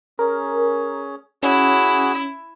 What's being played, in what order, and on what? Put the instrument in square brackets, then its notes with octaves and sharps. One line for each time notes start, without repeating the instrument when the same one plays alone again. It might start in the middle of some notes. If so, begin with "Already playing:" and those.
[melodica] C#4 G#4 [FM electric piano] A#4
[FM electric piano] C#4 [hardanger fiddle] E4 [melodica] F#4 G#4